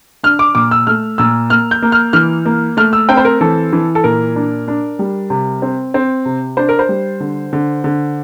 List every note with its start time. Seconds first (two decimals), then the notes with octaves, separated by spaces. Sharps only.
0.23 D4 F6
0.39 D6
0.55 A#2 D6
0.71 E6
0.87 A3 F6
1.18 A#2 E6
1.50 A#3 F6
1.71 G6
1.82 A#3
1.92 F6
2.13 E3 F6
2.46 A#3
2.77 A3 F6
2.93 E6
3.09 C4 G5
3.17 C5
3.25 A#4
3.41 E3 A4
3.73 E3
3.95 A4
4.04 A#2 A#4
4.36 D4
4.68 D4
4.99 G3
5.30 C3
5.62 C4
5.94 C4
6.25 C3
6.57 D4 C5
6.69 A#4
6.79 C5
6.89 G3
7.20 D3
7.53 D3
7.84 D3